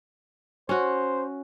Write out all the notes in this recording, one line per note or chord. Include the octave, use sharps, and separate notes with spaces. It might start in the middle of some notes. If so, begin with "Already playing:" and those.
C#4 F#4 C5